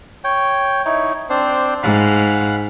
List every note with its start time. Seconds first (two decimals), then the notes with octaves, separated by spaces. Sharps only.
0.24 C#5 G5
0.85 D#4 E4 C#5
1.29 C4 D4 C5
1.83 G#2 F5 F#5 B5